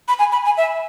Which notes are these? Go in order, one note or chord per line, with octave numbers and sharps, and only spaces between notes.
B5
G#5
B5
G#5
E5